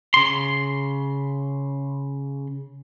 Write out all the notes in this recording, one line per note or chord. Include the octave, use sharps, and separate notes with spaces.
C#3 C6